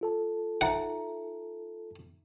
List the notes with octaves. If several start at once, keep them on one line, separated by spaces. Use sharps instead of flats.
F4 A4 A5
D#4 E5 F#5 A#5